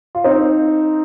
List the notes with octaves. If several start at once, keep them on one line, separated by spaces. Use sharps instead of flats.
F4
C4 D#4